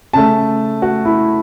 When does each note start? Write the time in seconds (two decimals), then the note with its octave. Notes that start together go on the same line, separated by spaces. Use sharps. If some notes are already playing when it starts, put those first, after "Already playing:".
0.13 C#3 A3 A5
0.82 F#4
1.05 E4